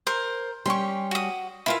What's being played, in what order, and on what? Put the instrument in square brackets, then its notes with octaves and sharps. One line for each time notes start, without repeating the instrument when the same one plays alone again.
[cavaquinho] A#4 C5
[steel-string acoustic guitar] G3 C#4 G4 [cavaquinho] C6 C#6
[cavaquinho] F#4 D#6
[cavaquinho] E4 F4 E5 [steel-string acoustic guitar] A#4 B4 G#5